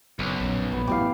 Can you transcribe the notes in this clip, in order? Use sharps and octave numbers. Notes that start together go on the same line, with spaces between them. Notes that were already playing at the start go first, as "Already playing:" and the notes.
F#1 B1
A#1 F#2
A#1 B3
F#2 A2 E3 G4 F5